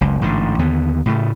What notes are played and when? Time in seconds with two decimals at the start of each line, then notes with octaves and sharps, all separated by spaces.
0.01 F#1 C#2
0.21 A1 G#2 D3
0.59 D#2 D3 B3
1.06 A2 C#3 A3